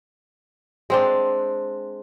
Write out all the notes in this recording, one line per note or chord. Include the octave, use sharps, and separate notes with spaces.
G#3 C4 D4